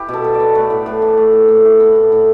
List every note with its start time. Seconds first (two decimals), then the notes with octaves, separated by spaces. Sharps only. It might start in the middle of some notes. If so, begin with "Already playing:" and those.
Already playing: E4 G4 B4
0.09 B2 A4
0.24 B3
0.34 D5
0.40 B3
0.55 A3 B4
0.70 A2
0.86 A2 B4
1.02 E3
1.17 A3
1.33 A2
1.49 A2
1.65 E3
1.80 B3
1.96 A2
2.12 A2